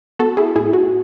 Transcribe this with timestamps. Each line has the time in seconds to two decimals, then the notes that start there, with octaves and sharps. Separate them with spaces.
0.19 B3 F#4 A4
0.37 E4 G#4
0.56 A2 E4 G#4
0.73 F#4